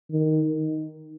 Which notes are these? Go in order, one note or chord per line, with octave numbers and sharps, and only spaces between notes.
D#3